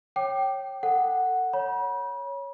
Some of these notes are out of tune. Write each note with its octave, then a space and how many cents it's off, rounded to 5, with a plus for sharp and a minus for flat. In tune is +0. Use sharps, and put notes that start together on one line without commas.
C#5 -20 G5 -15 D6 +20
A4 +25 F#5 +0
C#5 +0 B5 -40